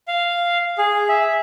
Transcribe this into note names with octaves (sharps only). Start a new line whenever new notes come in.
F5
G#4
E5